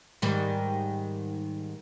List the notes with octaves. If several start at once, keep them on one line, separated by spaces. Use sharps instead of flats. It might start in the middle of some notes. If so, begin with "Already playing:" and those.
G#2 D#3 G3